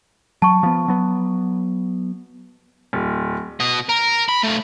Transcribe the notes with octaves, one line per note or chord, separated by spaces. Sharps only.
F#3 A5 C#6
F3 B3
F#3 B3
D1
B2 D#5
A#4
B5
A3 F4